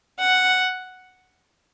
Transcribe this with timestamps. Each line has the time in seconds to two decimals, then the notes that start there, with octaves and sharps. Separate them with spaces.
0.20 F#5